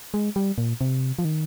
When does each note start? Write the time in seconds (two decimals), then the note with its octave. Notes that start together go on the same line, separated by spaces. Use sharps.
0.14 G#3
0.36 G3
0.58 A#2
0.81 C3
1.19 F3
1.25 D#3